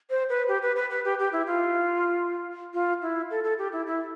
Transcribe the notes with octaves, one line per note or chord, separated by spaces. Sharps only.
C5
B4
G4
B4
B4
B4
G4
G4
E4
F4
F4
E4
A4
A4
G4
E4
E4